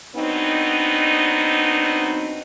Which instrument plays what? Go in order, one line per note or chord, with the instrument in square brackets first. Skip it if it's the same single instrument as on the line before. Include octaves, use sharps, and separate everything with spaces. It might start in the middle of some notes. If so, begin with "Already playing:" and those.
[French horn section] F#3 B3 C4 D4 D#4